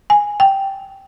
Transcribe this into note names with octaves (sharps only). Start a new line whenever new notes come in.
G#5
G5